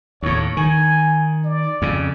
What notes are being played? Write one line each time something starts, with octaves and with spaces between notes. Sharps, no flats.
D#2 A2 C#5
D#3 G#5
D5
F2 C#3